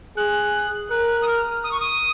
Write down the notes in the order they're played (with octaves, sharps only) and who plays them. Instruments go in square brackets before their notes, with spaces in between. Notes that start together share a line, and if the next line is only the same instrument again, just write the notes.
[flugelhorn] G#4 [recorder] F#6
[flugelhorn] A#4 [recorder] F#6
[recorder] D#6
F6
D#6
C#6
D#6